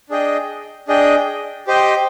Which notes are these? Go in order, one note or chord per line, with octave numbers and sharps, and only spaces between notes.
D4 G#4 D#5 G5
D4 G#4 D#5 G5
G4 C5 D#5 G5